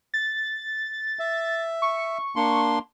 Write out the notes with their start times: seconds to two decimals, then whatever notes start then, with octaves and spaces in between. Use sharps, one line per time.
0.14 A6
1.19 E5
1.82 C#6
2.36 A#3 D4 C6